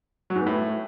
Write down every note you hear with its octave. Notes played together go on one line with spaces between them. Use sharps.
F#3
G#2
B3
A2